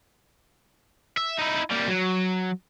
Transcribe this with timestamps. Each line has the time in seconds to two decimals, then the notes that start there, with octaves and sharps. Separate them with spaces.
1.17 E5
1.39 D#4 E4
1.71 G3 A#3
1.87 F#3